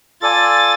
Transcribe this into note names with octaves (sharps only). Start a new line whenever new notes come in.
F4 A4 D5 G#5 A6